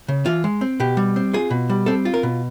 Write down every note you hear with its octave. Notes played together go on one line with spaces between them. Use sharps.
C#3
E3 F4
G#3
C4
B2 G4
G3
C4
F4 G#4
B2
G3
C4 A4
F4
A#4
B2